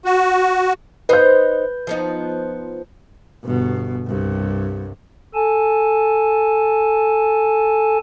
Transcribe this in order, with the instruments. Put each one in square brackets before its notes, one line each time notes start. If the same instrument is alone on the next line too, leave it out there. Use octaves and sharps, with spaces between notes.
[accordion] F#4
[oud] D#4 C5 D#5 [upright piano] B4 G6
[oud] F3 B3 D#4
[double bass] G1 B2
C2 G2
[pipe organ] A4 G#5 A5